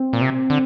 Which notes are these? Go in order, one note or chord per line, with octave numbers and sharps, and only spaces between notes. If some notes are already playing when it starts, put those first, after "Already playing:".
Already playing: C4
A#2
C3
D3